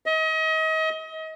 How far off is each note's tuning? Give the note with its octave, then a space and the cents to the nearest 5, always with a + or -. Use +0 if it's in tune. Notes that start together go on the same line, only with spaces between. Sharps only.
D#5 +35